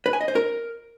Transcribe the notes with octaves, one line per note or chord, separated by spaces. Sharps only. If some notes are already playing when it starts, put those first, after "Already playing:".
B4
G#5
D#5
C5
A#4